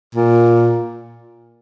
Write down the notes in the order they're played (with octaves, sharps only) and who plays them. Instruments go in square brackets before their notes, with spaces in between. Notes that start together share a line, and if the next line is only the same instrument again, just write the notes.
[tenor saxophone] A#2